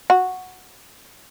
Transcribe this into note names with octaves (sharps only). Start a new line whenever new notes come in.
F#4